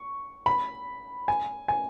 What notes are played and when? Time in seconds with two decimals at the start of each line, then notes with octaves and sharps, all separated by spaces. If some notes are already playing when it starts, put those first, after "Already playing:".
Already playing: C#6
0.46 B5
1.28 G#5
1.68 G#5